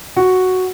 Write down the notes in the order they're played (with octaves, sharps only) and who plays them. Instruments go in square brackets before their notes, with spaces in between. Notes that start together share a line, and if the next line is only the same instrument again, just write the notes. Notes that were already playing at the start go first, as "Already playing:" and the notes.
[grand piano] F#4